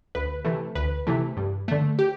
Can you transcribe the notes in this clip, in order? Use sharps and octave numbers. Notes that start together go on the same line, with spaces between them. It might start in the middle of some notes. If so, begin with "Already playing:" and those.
D2 B4
C3 E3 A3
D2 B4
C3 E3 A3
G2
D3 A3
G4